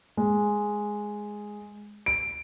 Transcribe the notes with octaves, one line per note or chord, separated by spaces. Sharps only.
G#3
D7